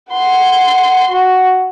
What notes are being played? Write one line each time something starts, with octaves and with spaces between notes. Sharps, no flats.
F#5 C6
F#4